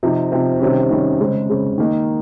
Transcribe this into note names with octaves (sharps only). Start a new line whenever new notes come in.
C3 F3 C4 D#4
C3 F3 C4 D#4
C3 D#3 G3 C#4
C3 D#3 G3 C#4
C#3 G#3 C4
C#3 G#3 C4
D#3 A#3 D#4